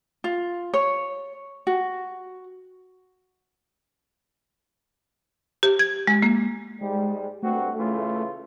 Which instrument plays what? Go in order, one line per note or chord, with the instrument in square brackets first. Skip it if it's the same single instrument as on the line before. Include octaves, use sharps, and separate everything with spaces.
[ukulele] F4
C#5
F#4
[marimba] G4
G#6
G#3
A#3
[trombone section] G#2 G3 [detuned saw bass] G#3
[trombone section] G2 C4 F#4 [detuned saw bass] A3
[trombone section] C#3 E3 F4